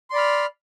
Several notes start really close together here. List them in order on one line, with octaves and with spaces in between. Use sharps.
C6 D5 B5 F6